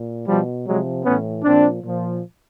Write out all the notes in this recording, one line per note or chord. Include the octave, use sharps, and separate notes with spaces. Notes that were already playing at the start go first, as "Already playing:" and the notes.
Already playing: A#2
B2 F3 G3
C3 F3 F#3 G#3
A2 E3 B3 C#4
A#2 F3 C4 D4
A#2 F3